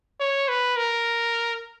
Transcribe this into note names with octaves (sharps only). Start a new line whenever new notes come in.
C#5
B4
A#4